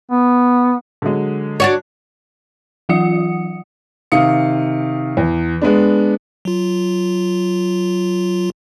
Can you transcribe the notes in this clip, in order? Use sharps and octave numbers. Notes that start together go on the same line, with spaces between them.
B3
D3 F#3 G#3
D4 F#4 C#5
E3 F#3 F4 F#5 D#6 C#7
C3 D#3 F5 D#6 C#7
E2
G#3 B3 D4
F#3 F4